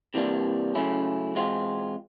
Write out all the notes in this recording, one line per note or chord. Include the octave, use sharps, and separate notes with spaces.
C3 E3 G3 A#3 D4
C#3 F#3 A3 C#4 E4
E2 B2 G#3 C4 F4